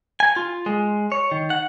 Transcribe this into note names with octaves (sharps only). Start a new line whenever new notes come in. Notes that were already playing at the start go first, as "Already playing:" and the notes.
G#5
F4
G#3
C#5
D#3
F#5